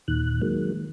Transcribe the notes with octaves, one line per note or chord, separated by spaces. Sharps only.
D#2 A#2 D#3 F#6
D#3 F#3 G#3 A#3